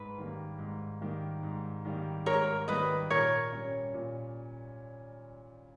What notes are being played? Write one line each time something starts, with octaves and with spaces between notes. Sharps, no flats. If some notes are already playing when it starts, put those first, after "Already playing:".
Already playing: G#2 B4
D#3 G3 A#3
G#2
D#3 G3 A#3
G#2
D#3 G3 A#3
G#2 A#4 C#5
D#3 G3 A#3 B4 D#5
A#2 A#4 C#5
G3 C#4
A#2